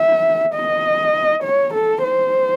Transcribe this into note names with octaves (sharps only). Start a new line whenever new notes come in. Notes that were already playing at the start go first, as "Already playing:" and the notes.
Already playing: E5
D#5
C#5
A4
C5